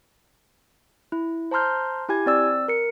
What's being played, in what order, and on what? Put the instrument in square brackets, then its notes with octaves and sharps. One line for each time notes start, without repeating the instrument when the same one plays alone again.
[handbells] E4
C5 A5 A#5 C6 F6 G6
E4 G4 G#5 G#6
C4 D5 E6
A#4 C#7